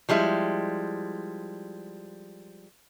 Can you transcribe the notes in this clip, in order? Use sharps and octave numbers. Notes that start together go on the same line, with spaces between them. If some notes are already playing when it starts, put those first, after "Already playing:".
F3 G3 G#3 E4